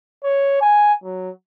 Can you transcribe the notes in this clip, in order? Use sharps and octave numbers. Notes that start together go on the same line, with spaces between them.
C#5
G#5
F#3